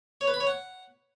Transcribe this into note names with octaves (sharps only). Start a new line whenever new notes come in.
C#5
B4
B5
C#5
F#5